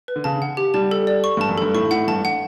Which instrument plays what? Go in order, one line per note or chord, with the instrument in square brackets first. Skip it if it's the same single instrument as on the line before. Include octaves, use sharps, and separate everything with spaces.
[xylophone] B4
[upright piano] D3
[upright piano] C#3 [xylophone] A5
[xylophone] F#5
G4
[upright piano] G3 [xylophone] A5
[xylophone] A4
D5
C#6
[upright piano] G2 [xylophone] A5
[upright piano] F#2
[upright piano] G2 [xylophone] A4
[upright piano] A2 [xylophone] C#6
[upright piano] A2 [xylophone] F#5
[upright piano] G2 [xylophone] A5
[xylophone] F#5